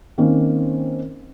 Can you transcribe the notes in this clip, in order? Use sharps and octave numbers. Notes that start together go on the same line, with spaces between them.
D#3 A#3 C4 C#4